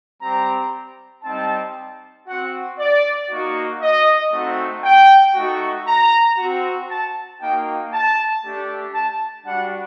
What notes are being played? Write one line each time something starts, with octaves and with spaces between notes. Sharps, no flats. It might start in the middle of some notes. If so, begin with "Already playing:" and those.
G3 C4 G4 A#5
G3 C4 D#4 A5
C4 F#4 F#5
D5
A#3 D#4 F#4
D#5
A3 C4 D#4 F#4
G5
A3 D#4 F#4
A#5
C4 F#4
A5
A#3 D#4 F#4 G5
A5
A3 D4 G4
A5
G3 D4 F#4 F#5